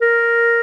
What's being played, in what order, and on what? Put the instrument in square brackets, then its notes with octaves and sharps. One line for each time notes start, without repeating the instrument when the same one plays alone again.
[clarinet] A#4